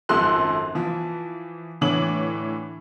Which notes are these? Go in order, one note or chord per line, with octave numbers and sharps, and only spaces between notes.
G#1 F#2 F3 A4 C6 F#6
E3 F3
A2 D3 E3 C#5 D6 F#7